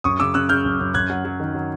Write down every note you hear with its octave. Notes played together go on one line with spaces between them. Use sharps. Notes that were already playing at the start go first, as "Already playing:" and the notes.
F#2 C#6 D#6
C#3 D6 E6
C#3 E6 F#6
C#3 F6 G6
F#2
F#2
F#2 F#6 G#6
F#3
F#3
D#3
F#3